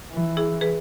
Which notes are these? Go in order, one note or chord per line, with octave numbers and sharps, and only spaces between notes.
E3
E4 G#4
G#4 B4